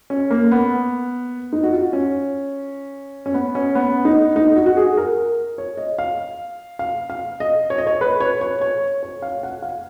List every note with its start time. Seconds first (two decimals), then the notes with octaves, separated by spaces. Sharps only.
0.10 C#4
0.30 A#3
0.51 B3
1.53 D#4
1.63 F#4
1.73 F4
1.93 C#4
3.26 C#4
3.34 B3
3.55 C#4
3.75 B3
4.05 D#4
4.36 D#4
4.56 F#4
4.66 F#4
4.77 G#4
4.97 A#4
5.58 C#5
5.77 D#5
5.99 F5
6.79 F5
7.10 F5
7.40 D#5
7.70 C#5
7.78 D#5
7.87 C#5
8.01 B4
8.20 C#5
8.41 C#5
8.61 C#5
9.03 C#5
9.22 F5
9.43 F#5
9.62 F5